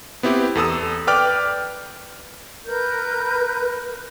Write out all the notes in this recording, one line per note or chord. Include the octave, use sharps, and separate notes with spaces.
B3 C4 E4 G4
E2 A4 D#6 E6
B4 D5 G5 D6 F6
A#4 B4 G6